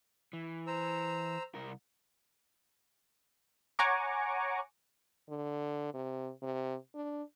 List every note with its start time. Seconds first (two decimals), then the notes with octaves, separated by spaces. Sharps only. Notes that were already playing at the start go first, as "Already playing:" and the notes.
0.33 E3
0.67 C5 A#5 E6
1.55 C2 A#4
3.79 C#5 F#5 G#5 A#5 C#6 D6
5.29 D3
5.94 C3
6.42 C3
6.94 D4